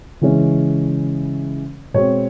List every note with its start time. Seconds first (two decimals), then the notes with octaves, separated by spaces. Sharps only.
0.21 C#3 E3 G#3 C#4
1.94 B2 G#3 C4 C#5